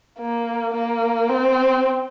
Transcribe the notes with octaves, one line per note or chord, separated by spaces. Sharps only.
A#3
A#3
C4